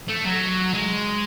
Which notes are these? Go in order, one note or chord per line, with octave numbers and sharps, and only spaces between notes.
A3
F#3
G#3